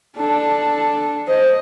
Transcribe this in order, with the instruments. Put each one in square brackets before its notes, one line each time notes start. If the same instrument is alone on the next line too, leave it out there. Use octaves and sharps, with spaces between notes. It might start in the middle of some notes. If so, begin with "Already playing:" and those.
[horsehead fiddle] D4 A4
[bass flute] C5 [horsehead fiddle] D#5